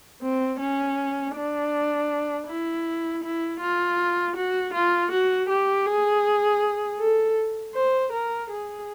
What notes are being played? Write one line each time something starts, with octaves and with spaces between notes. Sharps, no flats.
C4
C#4
D4
E4
E4
F4
F#4
F4
F#4
G4
G#4
A4
C5
A#4
G#4